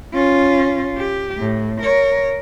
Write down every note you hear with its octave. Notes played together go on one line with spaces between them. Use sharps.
C#4 F4
G4
A2
A#4 C#5